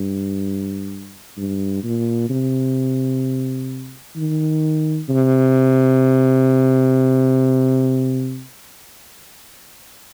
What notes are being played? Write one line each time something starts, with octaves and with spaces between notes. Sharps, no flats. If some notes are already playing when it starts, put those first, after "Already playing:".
Already playing: G2
G2
A#2
C3
D#3
C3